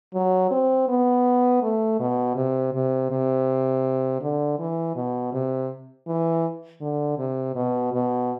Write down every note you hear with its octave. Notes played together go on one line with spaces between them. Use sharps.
F#3
C4
B3
A3
B2
C3
C3
C3
D3
E3
B2
C3
E3
D3
C3
B2
B2